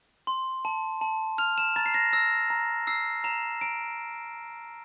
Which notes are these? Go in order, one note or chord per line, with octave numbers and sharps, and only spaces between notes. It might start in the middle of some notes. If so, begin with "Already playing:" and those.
C6
A5
A5
F6 F7
E7
A#5 A6
C7
A#6
E6 A#6
A#5
E6 C7
A#5 E7
A#5 D7